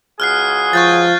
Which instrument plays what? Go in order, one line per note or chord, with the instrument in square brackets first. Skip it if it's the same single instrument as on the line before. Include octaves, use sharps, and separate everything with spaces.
[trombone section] C#2 F#4 G#4 [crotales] F6 F#6 C7
[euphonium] F3 [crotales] C#6 G6 A6